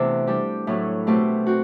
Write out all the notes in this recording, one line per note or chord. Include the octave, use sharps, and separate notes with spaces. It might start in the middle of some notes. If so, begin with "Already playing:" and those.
Already playing: C3 E3 A3 B3 D4 E4
G3 D4 G4
A2 F#3 A3
B2 A3 C4 G4
C4 F#4